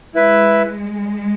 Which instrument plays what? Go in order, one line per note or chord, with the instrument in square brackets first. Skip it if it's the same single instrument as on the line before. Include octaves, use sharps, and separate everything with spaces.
[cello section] G#3 [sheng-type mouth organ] E4 B4 E5